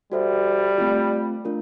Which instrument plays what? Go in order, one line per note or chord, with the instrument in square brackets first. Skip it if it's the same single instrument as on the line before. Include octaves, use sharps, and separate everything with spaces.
[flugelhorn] G3 [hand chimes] F#4 A4 C5 E5
[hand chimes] A3 C4 F4
A3 D4 F4 A#4